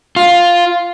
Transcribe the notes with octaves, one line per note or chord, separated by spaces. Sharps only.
F4